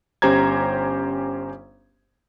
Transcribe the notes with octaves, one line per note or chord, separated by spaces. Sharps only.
G1 C#4 G4 C5 A#5 G#6